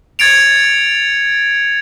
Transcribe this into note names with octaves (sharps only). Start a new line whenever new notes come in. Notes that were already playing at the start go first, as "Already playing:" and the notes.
G#6 A6 C#7 D7 F7